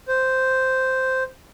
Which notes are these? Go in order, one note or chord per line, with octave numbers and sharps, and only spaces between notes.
C5